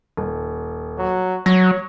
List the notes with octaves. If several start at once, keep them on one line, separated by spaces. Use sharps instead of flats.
D#1
F#3
F#3 C#5 A#6